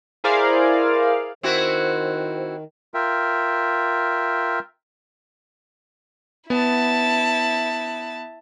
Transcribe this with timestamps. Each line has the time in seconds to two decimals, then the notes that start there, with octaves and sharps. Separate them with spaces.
0.24 E4 G#4 A#4 C5 D5 F5
1.43 D#3 C4 E4 F#4 C5
2.94 F4 A#4 E5 G5
6.50 B3 E4 A5